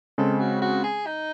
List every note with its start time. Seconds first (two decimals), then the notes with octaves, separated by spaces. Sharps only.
0.18 C#3 G#3 C4 A4
0.40 F#4
0.62 F#4
0.84 G#4
1.06 D#4